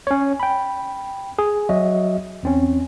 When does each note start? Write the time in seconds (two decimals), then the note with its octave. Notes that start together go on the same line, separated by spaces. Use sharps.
0.07 C#4 C#5
0.40 G5 B5
1.39 G#4
1.69 F#3 F#4 D#5 E5
2.43 E2 C4 C#4